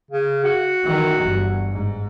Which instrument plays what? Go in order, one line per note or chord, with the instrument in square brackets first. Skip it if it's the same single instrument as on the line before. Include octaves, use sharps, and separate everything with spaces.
[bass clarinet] C#3
F#4
[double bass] D#3 E3
G1
G#2